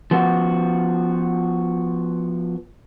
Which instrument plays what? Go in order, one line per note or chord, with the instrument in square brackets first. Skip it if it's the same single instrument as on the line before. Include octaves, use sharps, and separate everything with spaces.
[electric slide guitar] F3 B3 F#4